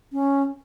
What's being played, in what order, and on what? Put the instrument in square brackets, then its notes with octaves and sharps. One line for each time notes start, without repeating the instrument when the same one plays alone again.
[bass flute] C#4